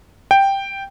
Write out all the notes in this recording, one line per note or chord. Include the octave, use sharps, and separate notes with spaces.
G5